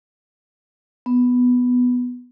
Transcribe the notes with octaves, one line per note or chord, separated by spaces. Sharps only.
B3